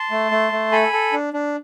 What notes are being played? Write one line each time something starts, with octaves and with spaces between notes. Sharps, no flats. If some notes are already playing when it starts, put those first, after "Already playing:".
Already playing: A5 C6
A3
A3
A3
A4 G#5 B5
A4
D4
D4